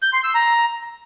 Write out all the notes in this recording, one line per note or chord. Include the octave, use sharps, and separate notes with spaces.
G6
C6
E6
A#5